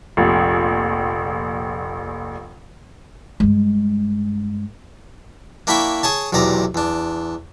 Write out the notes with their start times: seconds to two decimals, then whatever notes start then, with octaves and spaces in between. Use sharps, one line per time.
0.17 F1 A#1
3.40 G2 G#3
5.67 A#3 D4 E4 G5 B5 C#6
6.03 G#4 C#5 A5
6.33 B1 E2 C3 D5 A#5
6.75 E2 D4